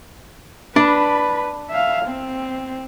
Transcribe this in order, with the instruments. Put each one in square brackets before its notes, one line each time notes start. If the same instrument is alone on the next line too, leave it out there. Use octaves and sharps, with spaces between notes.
[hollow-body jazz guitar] D4 [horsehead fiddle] B4 B5
[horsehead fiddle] E5 F5
C4